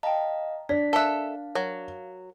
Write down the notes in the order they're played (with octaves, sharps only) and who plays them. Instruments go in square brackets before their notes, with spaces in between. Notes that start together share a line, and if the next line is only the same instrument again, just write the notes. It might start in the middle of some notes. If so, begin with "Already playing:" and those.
[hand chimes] D#5 F5 A#5 [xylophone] G5 A5
[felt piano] D4 [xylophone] C#5 [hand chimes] B6
[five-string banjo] A4 E5 [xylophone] A#4 F#6 [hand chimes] F5
[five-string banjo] F#3 [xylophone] A#4